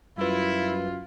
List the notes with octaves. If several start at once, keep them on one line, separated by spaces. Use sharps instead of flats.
F#2 G3 E4 F4 B4